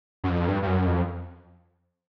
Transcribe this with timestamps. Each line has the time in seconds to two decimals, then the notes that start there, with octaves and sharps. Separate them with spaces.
0.24 F#2
0.29 F2
0.48 G2
0.62 G2
0.67 F#2
0.86 F2